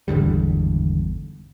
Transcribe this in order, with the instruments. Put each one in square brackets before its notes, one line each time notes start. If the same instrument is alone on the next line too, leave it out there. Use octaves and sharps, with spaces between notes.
[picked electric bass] G#1 E2 D3 G3